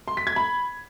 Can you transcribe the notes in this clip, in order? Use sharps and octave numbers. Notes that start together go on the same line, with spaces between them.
C6
B6
G#6
B5